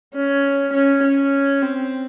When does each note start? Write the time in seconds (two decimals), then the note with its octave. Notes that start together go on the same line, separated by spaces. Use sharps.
0.14 C#4
0.73 C#4
1.02 C#4
1.62 C4